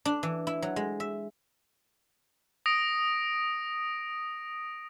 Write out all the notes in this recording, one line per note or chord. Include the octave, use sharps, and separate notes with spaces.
D4
E3
E4
F#3
G#3
E5
D#6 A#6 D7